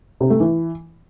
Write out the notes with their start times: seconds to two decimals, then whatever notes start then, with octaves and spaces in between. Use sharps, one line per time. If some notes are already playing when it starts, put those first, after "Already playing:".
0.21 C3
0.30 A3
0.40 E3